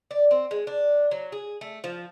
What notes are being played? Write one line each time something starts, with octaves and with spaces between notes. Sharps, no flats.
D5
C4
G#3
D4
F#3
G#4
A3
F3